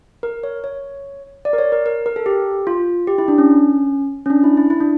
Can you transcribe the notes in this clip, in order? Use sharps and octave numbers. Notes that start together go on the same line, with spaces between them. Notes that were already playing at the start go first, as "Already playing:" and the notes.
A#4
C#5
C#5
D5
A#4
C#5
A#4
A#4
A#4
A4
G4
F4
G4
E4
D4
C#4
C#4
D4
E4
E4
E4
D4